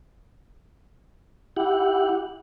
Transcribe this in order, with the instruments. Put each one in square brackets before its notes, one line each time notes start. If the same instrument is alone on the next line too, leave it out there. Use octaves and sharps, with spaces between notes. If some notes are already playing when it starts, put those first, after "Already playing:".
[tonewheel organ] E4 G4 F#5